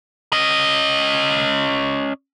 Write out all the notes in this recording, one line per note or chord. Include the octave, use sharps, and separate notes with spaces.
C#4 D#5